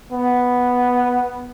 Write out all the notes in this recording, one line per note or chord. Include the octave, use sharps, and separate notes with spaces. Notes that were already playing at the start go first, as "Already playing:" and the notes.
B3